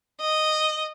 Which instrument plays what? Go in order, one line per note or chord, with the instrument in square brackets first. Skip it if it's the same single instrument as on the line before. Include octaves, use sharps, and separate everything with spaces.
[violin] D#5